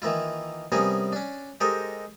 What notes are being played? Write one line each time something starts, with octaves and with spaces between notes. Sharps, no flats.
D#3 E3 A#3 E4 F4
C3 G3 B3 C#4 G#4 A#4
C#4 D4
G#3 G4 A4 A#4 C5 D#5